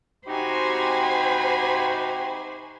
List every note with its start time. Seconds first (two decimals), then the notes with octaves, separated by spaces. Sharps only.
0.28 C3 D#4 F#4 G4 C5 G#5 B5